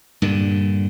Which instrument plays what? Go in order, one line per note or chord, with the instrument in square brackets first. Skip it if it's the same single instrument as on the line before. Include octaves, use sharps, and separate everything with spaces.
[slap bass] G2 A#2 D3